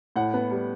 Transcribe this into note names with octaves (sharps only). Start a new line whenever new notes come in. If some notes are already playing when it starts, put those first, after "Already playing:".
A2 F#5
B3
G3